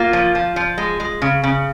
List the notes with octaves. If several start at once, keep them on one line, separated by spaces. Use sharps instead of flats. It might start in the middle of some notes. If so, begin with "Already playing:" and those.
Already playing: A#3 F4
F3
F3
F3
G#3
G#3
C#3
C#3